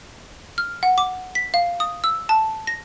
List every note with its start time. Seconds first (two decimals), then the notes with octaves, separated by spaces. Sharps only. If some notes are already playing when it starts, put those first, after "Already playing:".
0.58 F6
0.83 F#5
0.98 D6
1.35 B6
1.54 F5
1.80 D#6
2.04 E6
2.29 A5
2.67 A#6